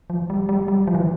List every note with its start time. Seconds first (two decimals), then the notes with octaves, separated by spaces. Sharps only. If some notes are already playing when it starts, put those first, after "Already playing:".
0.10 F3
0.30 G3
0.49 G3
0.68 G3
0.87 F3
0.95 E3